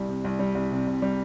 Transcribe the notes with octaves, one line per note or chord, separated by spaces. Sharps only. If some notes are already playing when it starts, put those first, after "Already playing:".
Already playing: C2 G3
C3
C2
G3
C2
C3
C2
G3